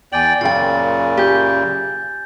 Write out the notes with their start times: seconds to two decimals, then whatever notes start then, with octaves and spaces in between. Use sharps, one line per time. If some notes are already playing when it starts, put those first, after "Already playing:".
0.13 E2 D5 G5 G#5 F#7
0.41 F#2 A#2 C#3 F4 G5 A6
1.17 G4 G#5 G6